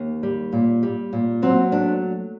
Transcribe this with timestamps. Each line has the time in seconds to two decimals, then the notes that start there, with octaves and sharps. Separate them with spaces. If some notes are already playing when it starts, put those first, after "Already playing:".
Already playing: D#2
0.23 G3
0.53 A#2
0.83 G3
1.13 A#2
1.42 F#3 C4
1.72 A3 D4